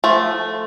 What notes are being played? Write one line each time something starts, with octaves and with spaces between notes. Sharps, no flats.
F3 A3